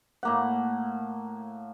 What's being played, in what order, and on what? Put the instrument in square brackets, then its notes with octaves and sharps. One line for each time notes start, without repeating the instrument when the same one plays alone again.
[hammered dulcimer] A2 A#3 F#5